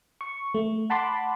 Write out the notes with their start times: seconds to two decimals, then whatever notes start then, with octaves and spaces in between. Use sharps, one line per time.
0.21 C#6
0.54 A3
0.90 F#5 A5 B5 C6 D6